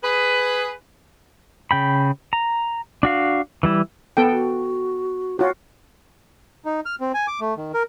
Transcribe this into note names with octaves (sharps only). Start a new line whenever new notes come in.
G#4 B4
C#3 G5 B5
A#5
D4 F#4 F5
E3 G3 E4
B3 A4 G5
F#4
F4 F#4 C#5
D#4
F6
C4
G#5
D6
A3
D#3
A#4